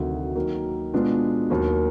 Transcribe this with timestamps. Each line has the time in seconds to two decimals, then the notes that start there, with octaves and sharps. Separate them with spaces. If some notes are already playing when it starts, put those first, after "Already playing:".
Already playing: D2 C3 D#3 F#3
0.35 D#3 F#3 A#3
0.94 B2 G#3 B3 D4 F4
1.50 D#2 D#3 F#3 A#3